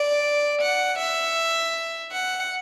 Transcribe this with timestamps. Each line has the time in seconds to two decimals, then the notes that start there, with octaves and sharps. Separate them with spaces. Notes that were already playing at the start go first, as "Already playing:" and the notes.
Already playing: D5
0.62 F#5
0.99 E5
2.12 F#5